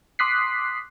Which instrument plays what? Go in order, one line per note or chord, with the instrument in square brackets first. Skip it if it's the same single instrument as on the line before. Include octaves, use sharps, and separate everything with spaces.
[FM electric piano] C6 D6 D#6 F#6 B6 C7